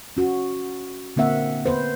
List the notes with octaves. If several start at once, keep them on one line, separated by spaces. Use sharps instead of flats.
C#4 F#4
D3 A#3 C4 E5 F#5
B3 B4 C5